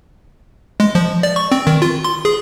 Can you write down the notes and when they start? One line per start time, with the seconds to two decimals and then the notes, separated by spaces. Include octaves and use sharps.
0.80 G#3
0.95 F3
1.23 D5
1.36 C#6
1.52 C4
1.67 D#3
1.82 F4
2.04 C6
2.25 G#4